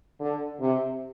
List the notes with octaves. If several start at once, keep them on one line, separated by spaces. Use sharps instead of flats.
D3
C3